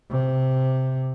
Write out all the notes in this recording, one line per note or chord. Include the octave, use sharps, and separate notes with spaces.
C3